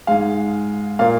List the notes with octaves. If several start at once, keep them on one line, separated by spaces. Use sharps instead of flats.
G#2 G#3 F5
A#2 A#3 F5